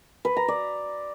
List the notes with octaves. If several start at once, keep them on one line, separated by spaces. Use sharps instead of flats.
B4
A#5
D5